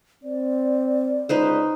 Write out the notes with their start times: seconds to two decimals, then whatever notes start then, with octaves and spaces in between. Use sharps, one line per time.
0.24 C4 D5
1.29 C#2 D#4 B4 C5